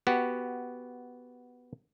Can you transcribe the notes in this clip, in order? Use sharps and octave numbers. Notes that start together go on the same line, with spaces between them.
B3 F#4 G4